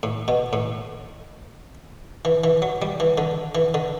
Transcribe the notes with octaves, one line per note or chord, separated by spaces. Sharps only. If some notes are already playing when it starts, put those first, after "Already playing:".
A2
B2
A2
E3
E3
F#3
G3
E3
D3
E3
D3